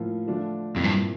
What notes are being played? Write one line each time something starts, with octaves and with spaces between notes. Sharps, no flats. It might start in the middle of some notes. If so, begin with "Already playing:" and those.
Already playing: A2 F3 A#3 F4
D3 F3 A3 D4 F4
F2 A#2 F3 C4 E4
G2